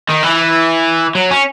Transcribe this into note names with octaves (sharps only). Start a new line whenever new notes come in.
D#3
E3
F#3
C#4